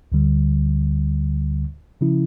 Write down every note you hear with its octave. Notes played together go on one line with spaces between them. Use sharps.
D2 D3 G3
C#3 F3 C#4 E4